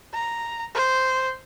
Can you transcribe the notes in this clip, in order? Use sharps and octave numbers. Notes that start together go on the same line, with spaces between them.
A#5
C5